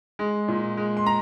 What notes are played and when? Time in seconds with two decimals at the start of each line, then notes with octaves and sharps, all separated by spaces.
0.19 G#3
0.48 A#2
0.77 G#3
0.97 C6
1.06 A#5